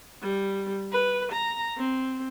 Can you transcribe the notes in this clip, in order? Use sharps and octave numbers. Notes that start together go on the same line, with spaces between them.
G3
B4
A#5
C4